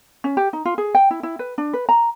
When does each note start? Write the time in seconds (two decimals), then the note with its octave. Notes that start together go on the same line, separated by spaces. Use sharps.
0.24 C#4
0.37 G4
0.53 D#4
0.65 F4
0.78 G#4
0.95 G5
1.11 E4
1.23 E4
1.39 B4
1.58 D4
1.73 B4
1.89 A#5